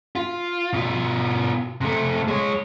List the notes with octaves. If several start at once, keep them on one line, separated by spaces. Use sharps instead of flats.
F4
B2 F4
C3 A3
G#3 C#5